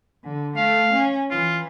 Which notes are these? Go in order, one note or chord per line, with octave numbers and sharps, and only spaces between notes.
D3
A3 F5
C#4
E3 F4